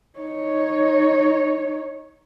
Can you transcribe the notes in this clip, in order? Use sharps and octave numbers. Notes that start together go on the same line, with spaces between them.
D#4 C#5